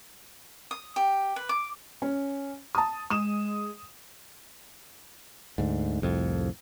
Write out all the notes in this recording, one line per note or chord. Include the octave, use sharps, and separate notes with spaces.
D#6
G4
B4
D6
C#4
A5 D#6
G#3 D#6 E7
D2 G#2
C2 F2 A2